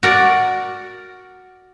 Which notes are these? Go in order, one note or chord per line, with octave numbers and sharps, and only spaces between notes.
F#4 A#4 D5